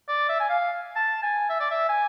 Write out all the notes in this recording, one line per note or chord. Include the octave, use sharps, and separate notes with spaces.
D5
E5
G#5
F5
A5
G#5
E5
D5
E5
G#5